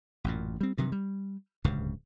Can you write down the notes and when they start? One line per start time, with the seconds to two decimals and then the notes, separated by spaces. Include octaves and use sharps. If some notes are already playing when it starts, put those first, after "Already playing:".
0.24 A1 F#2 A#2
0.61 G3 C4
0.78 G2 C3 D#3 F#3
0.92 G3
1.64 D1 C#2 G2 C#3